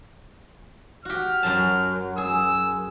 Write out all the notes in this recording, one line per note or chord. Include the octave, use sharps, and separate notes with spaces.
F#4 G4 F6
F#2 F#3 A5
G#4 E6